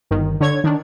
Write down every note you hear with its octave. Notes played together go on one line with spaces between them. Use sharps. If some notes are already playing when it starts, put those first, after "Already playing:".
G1 D#3
D3 C#5 G#6
D#3 D4